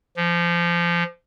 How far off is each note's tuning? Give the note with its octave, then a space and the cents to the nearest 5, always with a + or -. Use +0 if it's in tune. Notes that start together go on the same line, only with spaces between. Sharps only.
F3 -25